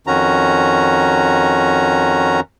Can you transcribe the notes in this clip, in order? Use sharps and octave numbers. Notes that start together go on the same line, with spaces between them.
F2 D#3 C#4 F#4 A#5